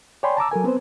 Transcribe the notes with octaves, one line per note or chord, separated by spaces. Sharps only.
C#5 D5 G5 G#5 B5 C6
A5 A#5 D6 E6
F#3 A4 A#4 G#5
B3 C4 B4 C5